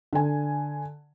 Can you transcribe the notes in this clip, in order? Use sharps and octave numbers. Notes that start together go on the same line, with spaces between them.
D3 G#5